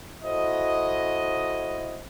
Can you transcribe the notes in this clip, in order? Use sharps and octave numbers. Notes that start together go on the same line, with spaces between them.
E4 F#4 A4 C5 D#5